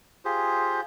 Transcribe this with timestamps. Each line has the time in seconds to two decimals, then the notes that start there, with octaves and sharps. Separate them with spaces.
0.25 F4 G4 G#4 C5